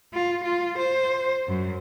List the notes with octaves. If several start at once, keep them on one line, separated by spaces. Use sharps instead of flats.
F4
F4
C5
F#2